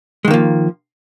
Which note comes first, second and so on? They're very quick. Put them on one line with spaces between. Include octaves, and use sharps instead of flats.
G#3 D#3 A#3 F3